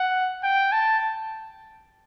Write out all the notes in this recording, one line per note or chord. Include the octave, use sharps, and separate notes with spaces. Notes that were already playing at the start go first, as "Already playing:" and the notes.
Already playing: F#5
G5
A5